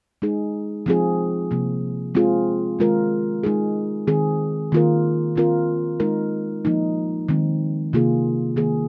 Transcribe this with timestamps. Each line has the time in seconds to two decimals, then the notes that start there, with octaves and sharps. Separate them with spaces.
0.22 G#3 D#4 G#4
0.86 F3 C4 F4 G#4
1.51 C3 F3 A#3
2.15 G#3 C4 F4 G#4
2.79 D#3 G#3 F4 A#4
3.44 G#3 D#4 G#4
4.07 D#3 C4 G#4
4.72 D#3 A#3 F4 A#4
5.36 D#3 C4 F4 A#4
6.00 G#3 D#4 A#4
6.65 F3 A#3 D#4
7.29 D#3 G#3 C4
7.93 C3 D#3 A#3 F4 G#4
8.56 D#3 A#3 G#4